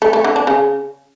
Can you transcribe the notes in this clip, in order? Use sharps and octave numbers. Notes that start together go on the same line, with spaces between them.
A3
A3
D3
D4
C#3